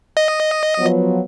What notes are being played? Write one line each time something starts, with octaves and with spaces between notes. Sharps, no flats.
D#5
F3 F#3 B3